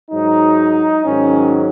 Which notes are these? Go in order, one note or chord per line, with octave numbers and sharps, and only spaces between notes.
G#2 F#3 D#4
G#2 D#3 F#3 C#4